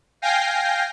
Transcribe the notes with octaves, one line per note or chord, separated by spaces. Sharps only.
F5 G5 G#5 G6 A#6 C7